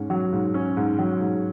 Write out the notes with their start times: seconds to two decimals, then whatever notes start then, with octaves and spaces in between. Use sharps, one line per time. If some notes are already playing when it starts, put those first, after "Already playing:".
Already playing: G#2 C#4
0.10 F#3
0.33 G#2
0.54 C#4
0.77 G#2
0.98 F#3
1.21 G#2